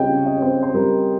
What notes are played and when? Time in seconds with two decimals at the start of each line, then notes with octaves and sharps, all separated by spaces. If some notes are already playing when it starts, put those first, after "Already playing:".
Already playing: C#2 G3 C4 C#5 D#5 G5
0.09 C#3
0.26 D#5
0.37 C#5
0.42 C4 C5
0.62 C5
0.74 G3 A#4